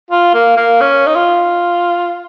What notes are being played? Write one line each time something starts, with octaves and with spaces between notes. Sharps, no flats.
F4
A#3
A#3
C#4
D#4
F4